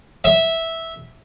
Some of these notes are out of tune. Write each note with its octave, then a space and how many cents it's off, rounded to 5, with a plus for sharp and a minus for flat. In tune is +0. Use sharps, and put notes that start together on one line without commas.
E5 -10